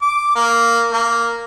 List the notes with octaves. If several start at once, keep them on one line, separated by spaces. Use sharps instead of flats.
D6
A#3
A#3